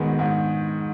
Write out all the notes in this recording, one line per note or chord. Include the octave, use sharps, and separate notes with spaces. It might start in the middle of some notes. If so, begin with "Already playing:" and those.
Already playing: G#2 D#3 G#3 B3
G#2